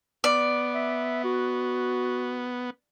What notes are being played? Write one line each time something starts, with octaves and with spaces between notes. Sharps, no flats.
B3 D5
E5
F#4